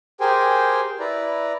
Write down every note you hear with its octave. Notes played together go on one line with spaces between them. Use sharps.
G4 G#4 A#4 C5 G5 G#5
E4 B4 D5 A#5